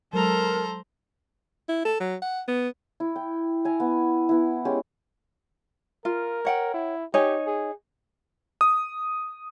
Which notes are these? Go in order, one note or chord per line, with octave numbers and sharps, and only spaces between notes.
F#3 G#3 A4 A#4 C5 A#5
E4
A4
F#3
F#5
B3
E4
G5
E4 G#5 A#5
B3
B3 E4
G#3 C#4 G4
F4 A#4
C#5 F#5 G5
E4
D#4 G4 C#5 G#5
G#4
D#6